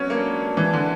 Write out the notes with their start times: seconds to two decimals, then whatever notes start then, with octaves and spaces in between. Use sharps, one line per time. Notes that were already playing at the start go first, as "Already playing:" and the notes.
Already playing: F#3 B3 C#4
0.10 A#3 D4
0.57 E3
0.73 D3